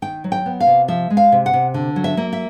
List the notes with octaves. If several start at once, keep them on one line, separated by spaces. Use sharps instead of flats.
D#3 G5
F#3
G5
B3
F5
C3
F3 E5
G#3
F5
C3
F#5
C3
D3
F#3
E5
A#3
E5